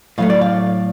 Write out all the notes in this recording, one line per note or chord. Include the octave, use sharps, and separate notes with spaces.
A2 F#3 A3 F5
D5
F5